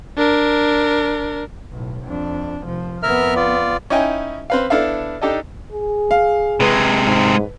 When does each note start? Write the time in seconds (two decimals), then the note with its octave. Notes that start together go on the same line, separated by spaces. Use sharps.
0.17 D4 A#4
1.70 B1 A2
2.06 F2 D4
2.64 F1 F3
3.03 F2 B3 A#4 E5 F6
3.36 F4 D5
3.90 C#4 D#4 E4 D#5 G5 G#5
4.50 C4 B4 F5
4.70 B3 D4 E4 A4 E5 F5
5.21 D4 D#4 G4 A4 D#5
5.73 G#4
6.11 F5
6.60 C3 G#3 B4
7.06 G#2